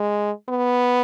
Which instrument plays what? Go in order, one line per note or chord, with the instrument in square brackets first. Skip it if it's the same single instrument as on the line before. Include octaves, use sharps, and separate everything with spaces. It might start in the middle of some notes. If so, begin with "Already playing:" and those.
Already playing: [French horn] G#3
B3